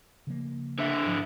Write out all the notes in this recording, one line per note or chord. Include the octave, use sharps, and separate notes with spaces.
C#3 F3 A#3
D3 E4
G#2 F3